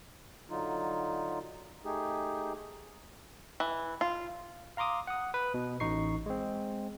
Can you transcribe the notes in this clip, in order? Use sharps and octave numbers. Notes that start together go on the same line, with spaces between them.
D3 F#3 D#4 F4
A3 D#4 G4 G#4
E3
F4
F5 A#5 C6 D6 D#6
F#5 D#6
B4
B2
A1 D#4 C#6 C7
G#3 C4